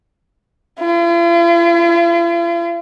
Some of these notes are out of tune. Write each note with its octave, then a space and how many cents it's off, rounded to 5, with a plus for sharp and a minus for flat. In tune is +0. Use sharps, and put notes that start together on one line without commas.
F4 -45